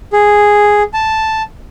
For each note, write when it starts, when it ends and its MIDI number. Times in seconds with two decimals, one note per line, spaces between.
0.13 0.83 68
0.94 1.42 81